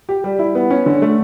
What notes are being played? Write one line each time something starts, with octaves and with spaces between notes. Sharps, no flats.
G4
G3
E4
B3
C#4
D3
A3